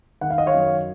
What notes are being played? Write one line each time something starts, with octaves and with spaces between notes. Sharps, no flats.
D#3 F#5
F5
D#5
C#5 F5
F#2